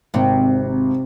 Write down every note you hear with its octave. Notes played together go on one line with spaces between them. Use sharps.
G#1 C3